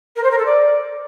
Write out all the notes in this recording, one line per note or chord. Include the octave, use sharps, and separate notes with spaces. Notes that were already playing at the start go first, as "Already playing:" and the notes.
A#4
C5
A#4
A4
D5